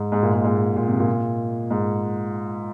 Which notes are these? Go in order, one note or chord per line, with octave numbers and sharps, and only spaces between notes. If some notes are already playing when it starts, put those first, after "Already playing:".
Already playing: G#2
G#2
A#2
G#2
G#2
A#2
C3
A#2
G#2